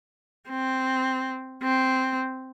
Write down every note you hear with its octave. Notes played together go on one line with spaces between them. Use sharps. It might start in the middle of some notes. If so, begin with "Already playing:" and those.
C4
C4